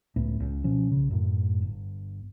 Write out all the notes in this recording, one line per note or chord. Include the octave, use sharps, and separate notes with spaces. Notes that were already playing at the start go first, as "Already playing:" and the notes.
C#2 A2 A3 B3
C#2
B2 F3 C#4
B1 C#3
F#2 A2
G1